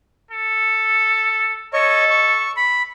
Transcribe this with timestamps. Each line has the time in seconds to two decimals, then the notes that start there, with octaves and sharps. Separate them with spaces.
0.31 A4
1.73 A4 C#5 D#5 C#6
2.11 C#6
2.56 B5